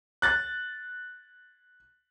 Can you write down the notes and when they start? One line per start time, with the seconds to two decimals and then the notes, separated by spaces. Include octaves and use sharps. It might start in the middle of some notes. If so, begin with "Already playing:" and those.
0.22 F#6 A6